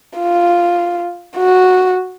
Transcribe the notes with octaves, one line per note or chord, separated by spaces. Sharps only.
F4
F#4